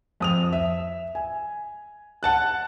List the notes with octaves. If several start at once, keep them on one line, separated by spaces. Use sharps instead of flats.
F2 D#6 F7
E5
G#5
F#5 A5 F#6